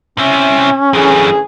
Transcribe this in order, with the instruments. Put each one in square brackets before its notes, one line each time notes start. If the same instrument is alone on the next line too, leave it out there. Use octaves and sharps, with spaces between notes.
[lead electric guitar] C3 E4 [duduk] C#4
[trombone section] A1 D3 G#4 [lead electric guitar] F#2 E3